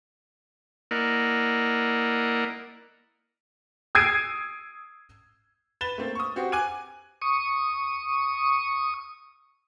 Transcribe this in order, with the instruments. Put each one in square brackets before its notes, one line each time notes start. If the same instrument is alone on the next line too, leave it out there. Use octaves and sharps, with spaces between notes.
[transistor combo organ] A#3 E4 A#4 D5 D#5 F#5
[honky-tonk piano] D#6 E6 G#6 C7 D7 D#7
[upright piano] B4 A6 E7 G7
A3 A#3 C4
C#6 D#6
C4 F#4 G4
G#5 D6 F#6 G#6 D#7
[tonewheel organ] C#6 D#6